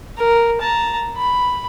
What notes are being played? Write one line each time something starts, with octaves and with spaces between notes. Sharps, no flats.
A#4
A5 A#5
B5